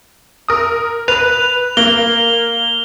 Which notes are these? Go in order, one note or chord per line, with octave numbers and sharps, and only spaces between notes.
A#4 D#6
B4 F7
A#3 G7